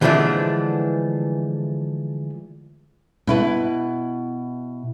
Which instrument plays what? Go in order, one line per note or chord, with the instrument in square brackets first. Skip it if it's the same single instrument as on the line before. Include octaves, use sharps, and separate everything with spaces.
[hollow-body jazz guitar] D3 E3 F3 G#3 A3 D4
[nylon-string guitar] B2 E4 B4